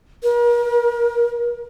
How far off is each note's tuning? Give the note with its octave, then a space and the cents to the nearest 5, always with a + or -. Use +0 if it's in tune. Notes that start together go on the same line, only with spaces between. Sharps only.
A#4 +35